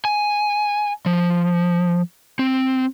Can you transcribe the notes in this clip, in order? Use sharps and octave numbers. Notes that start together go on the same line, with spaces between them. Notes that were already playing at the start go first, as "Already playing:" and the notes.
G#5
F3
C4